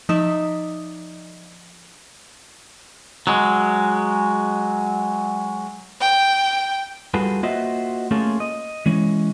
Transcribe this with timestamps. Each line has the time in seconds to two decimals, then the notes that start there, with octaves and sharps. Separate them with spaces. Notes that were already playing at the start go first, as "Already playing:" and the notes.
0.09 F3 D#4 D5 E5
3.27 F#3 G#3
6.01 G5
7.14 G3 F4 F#4 G#4 A4 B4
7.43 A#3 F4 F#4 C5 D#5 E5
8.11 A3 A#3 C#4 F4 G#4 A4
8.40 D#5
8.86 E3 G#3 C#4